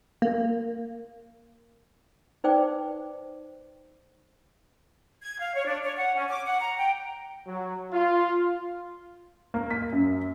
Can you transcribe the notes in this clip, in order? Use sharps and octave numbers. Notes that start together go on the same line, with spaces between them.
A#3
D#4 B4 C5 D5 G5 D6
G#6
F5
C#5
D4
C#5
F#5
C#4
D6
F#5
A#5
G5
F#3
F4
A#3
B6
F#2